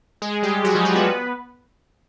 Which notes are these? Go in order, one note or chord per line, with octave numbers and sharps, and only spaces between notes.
G#3 G#4
G3 G4
F#3 F#4
F3 F4
F#3 F#4
B3 B4